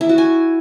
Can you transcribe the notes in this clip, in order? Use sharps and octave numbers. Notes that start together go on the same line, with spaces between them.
E4
F#4
G#5